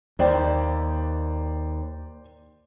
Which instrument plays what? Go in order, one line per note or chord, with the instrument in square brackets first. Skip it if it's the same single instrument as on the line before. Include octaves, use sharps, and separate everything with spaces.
[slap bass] D#2 [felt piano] C5 D5 G5